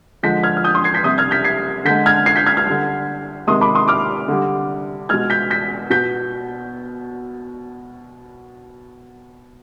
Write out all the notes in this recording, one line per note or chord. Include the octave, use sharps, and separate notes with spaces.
D3 F3 G#3 G6 B6
F6 G#6
F6
D#6 G6
C6 D#6
G#6 C7
G6 B6
C3 G3 D#6 G6
F6 G#6
G6 B6
G#6 C7
D3 G#3 G6 B6
F6 G#6
G#6 C7
G6 B6
F6 G#6
F6 G#6
D3 G3
C3 D#3 G#3 C6 D#6
B5 D6
C6 D#6
D6 F6
D3 G3
B2 G#3 F6 G#6
G6 B6
G6 B6
B2 G6 B6